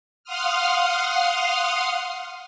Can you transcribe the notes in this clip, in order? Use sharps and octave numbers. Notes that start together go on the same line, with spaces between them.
F5 F#5 C6 D#6 F6